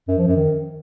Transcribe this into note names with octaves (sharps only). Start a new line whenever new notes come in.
F#2
F3
F#2
D#3